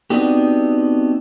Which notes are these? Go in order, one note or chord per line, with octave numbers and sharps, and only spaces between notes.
B3 C4 D4 D#4 F#4 G4